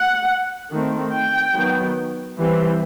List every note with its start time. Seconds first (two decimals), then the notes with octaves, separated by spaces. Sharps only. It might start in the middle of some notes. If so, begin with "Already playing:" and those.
Already playing: F#5
0.72 D#3 A3 C4
1.13 G5
1.55 D#3 F#3 B3
2.37 E3 G3 C4